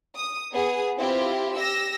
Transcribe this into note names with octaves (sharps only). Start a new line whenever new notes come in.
D#6
B3 G#4 D#6
C4 E4 F4 G4
G4 E6 A#6